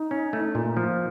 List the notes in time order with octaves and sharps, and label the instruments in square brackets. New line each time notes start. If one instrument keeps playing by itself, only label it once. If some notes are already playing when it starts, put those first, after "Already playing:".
Already playing: [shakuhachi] D#4
[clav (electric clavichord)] C#4
A3
A#2
F3